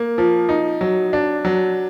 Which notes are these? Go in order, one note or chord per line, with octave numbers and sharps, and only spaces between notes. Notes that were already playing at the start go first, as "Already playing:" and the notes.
Already playing: A#3
F3
D#4
F#3
D4
F#3